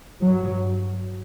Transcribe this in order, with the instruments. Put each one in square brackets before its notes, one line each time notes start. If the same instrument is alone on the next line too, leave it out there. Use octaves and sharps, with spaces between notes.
[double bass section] G2 F#3